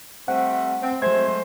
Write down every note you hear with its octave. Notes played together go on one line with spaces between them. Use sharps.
G3 A3 C4 F#5
C4
F#3 G#3 A3 C5 G#6